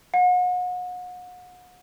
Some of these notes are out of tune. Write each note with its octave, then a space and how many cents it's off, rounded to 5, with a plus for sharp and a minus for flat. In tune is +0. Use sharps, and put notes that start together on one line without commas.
F#5 -35